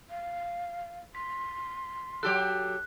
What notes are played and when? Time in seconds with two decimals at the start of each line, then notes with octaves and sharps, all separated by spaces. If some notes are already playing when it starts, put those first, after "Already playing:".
0.10 F5
1.15 C6 B6
2.23 F#3 G4 A4 F#6